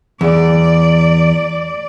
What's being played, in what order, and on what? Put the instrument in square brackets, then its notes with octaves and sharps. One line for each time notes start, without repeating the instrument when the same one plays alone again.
[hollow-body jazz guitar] E2 [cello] D5